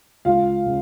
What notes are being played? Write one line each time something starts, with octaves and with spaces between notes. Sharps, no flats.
C#2 F4 F5
C#3